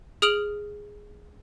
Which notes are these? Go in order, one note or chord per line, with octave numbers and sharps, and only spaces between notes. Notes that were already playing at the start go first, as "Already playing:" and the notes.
G#4 D#6 F6 D7 F7 F#7